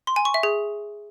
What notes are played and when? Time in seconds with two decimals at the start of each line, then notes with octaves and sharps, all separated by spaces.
0.07 C6
0.16 G#5
0.25 C#6
0.34 E5
0.43 G#4